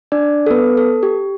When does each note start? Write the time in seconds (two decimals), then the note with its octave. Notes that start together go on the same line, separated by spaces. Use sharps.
0.12 D4 D5
0.46 A4
0.51 B3 B4
0.77 A4
1.03 G4